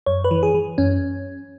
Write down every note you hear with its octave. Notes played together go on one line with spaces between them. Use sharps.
F#2 C#5
B4
E3
G#4
E3
F#2 C#4